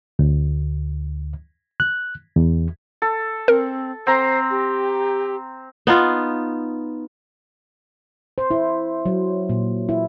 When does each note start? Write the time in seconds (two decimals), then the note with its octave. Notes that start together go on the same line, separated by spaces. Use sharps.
0.19 D2
1.80 F#6
2.36 E2
3.02 A4
3.48 C4 A#4
4.07 C4 C5 A#5
4.51 G4
5.87 B3 D#4 F4
8.38 C5
8.51 E4
9.06 F#3
9.49 A#2
9.89 E4